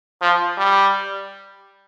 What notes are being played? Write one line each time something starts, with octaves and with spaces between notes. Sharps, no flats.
F3
G3